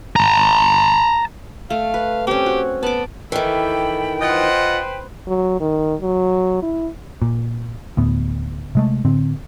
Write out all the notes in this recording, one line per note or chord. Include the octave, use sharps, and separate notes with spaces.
A5 A#5
A3 F5
B4
C4 C#4 G4
F#4
B3 A5 D6
D#3 E3 A4 G5 B5
F4 B4 C5 D#5 F#5
F#3
D#3
F#3
E4
A#2
D2 A2 B3
C3 G#3 A3
A2 D3 C4